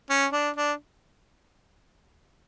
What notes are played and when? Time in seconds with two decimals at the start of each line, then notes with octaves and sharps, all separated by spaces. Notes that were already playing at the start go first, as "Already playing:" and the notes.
0.10 C#4
0.33 D4
0.56 D4